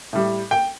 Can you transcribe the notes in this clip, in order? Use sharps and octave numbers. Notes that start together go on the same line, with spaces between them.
A2 G3
G5